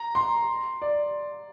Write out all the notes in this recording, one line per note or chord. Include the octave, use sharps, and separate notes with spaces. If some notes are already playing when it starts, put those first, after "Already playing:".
Already playing: A#5
C6
D5